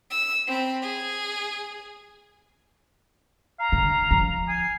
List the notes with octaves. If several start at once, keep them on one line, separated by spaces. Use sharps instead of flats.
E6
C4 B5
G#4
F5 A#5
D3
F3
G#5 C7